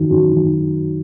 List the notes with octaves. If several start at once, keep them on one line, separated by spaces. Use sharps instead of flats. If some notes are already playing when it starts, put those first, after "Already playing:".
Already playing: F#2 D#3 F#3
F#2
D#3 F#3